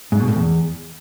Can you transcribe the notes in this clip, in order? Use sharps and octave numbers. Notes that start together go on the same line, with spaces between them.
G#2
B2
A2
E2